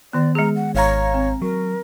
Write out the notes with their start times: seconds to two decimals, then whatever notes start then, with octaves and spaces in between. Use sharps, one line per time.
0.13 D#3 B3 D5
0.35 G#3 G#4 A#5
0.56 F#5
0.75 G#1 C#5 F5 A#5
1.14 C4
1.42 F#3 A#4